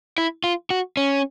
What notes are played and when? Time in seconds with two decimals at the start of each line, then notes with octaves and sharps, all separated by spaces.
0.18 E4
0.44 F4
0.70 F#4
0.97 C#4